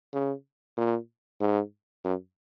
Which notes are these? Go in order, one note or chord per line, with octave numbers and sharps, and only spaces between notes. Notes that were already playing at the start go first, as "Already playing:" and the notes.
C#3
A#2
G#2
F#2